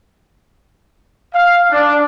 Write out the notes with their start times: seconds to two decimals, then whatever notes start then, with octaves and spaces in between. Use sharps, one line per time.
1.34 F5
1.71 D4